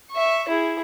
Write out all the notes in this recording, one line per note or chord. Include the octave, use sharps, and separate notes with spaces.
E5 C#6
E4 G#4